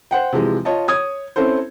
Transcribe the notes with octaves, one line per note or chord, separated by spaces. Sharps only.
C5 F#5 G5
C3 E3 F3 G#3
F4 C#5 D#5 A5
C#5 D#6 G#6
C4 C#4 E4 A4 C5